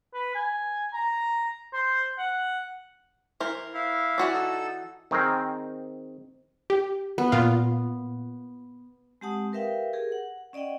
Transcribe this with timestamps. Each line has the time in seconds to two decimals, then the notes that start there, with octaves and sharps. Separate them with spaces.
0.14 B4
0.35 G#5
0.94 A#5
1.73 C5
2.18 F#5
3.40 E3 A#4 C5
3.74 E4 F5
4.18 E3 F#4 D5
4.33 D#4 A4 E6
5.11 D#3 C4 G#4 A#4 C5
6.70 G4
7.18 B3
7.32 A#2 F4
9.21 G#3 C4 G4 F#5 A5 D#6
9.52 G4 A#4 B4 E5 F5 G5
9.93 G4 G#4 A#4
10.12 F#5
10.53 C#4 D5 D#5 F#5 G5